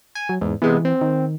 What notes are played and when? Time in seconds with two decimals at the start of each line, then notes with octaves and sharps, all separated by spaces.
0.15 G#5
0.29 F#3
0.41 E2 G#2
0.62 C3 E3 G#3 B3
0.85 C4
1.01 D#3